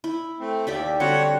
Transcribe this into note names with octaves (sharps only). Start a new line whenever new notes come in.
E4
A3 C4
D#2 G4 D5 E5
D3 G3 C4 F#4 C#5 F#5